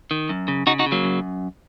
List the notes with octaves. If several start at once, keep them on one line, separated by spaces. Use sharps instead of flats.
D#3
F#2
C#3
C#3 D#4 F#4
D#4 F#4
C#3
F#3 A#3
F#2